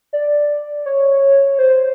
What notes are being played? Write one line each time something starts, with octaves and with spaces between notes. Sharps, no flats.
D5
C#5
C5